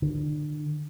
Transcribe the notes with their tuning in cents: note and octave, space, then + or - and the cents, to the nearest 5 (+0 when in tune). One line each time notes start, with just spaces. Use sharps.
D3 +35